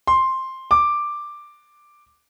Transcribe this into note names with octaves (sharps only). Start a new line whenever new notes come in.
C6
D6